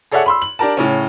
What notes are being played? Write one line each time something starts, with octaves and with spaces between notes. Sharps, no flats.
G#4 A4 C#5 D5 E5 F#5
B5 C6 E6
F#7
D4 G4 A#4 A5
A2 C#3 C#4